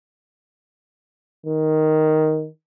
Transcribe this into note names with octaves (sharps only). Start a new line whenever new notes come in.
D#3